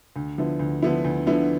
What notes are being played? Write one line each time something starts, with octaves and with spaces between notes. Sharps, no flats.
D2
D3 F3 B3 E4
D2
D3 F3 B3 E4
D2
D3 F3 B3 E4